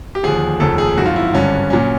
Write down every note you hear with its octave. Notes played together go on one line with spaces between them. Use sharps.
G4
D#2 D3 F3 G#4
F1 D#2 C#3 F3 A4
G#4
G#1 F#2 D#3 F#4
F4
E4
G#1 G2 D3 C#4
A#2 F#3 C#4